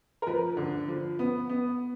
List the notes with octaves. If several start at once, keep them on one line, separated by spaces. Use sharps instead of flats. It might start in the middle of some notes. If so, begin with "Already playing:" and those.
A#4
F3 B4
D3
F3
B3
B3